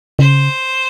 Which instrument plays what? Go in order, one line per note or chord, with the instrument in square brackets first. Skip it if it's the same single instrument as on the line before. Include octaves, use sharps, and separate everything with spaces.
[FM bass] C#3 [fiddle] C5